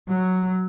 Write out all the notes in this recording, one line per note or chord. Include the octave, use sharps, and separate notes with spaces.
F#3